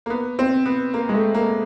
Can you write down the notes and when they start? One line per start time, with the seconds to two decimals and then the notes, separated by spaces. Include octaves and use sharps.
0.06 A#3
0.10 B3
0.39 C4
0.66 B3
0.94 A#3
1.09 G#3
1.14 A3
1.34 A#3